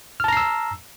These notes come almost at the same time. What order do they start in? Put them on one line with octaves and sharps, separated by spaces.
F6 A5 A#5 C7 E6